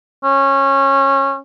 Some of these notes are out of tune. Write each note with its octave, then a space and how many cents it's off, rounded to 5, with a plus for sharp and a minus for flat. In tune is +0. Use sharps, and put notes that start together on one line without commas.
C#4 -20